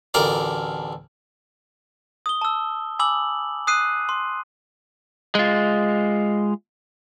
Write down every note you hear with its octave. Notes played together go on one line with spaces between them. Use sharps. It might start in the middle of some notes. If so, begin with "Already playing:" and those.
A1 D2 A#4 D5
D#6 G7
A5 E6
G#5 B5 D6 E6 F#7
D#6 F#6 C7 D#7
C6
G#3 F4